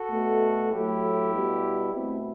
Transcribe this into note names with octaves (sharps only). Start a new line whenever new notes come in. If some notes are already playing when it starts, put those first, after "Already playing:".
Already playing: F#4 A4
B2 A3
A2 F#3 A3 E4 G4
B2 G3
B2 A3 C4 E4